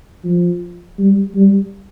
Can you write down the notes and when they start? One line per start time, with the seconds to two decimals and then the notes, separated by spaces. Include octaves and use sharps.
0.24 F3
0.98 G3
1.35 G3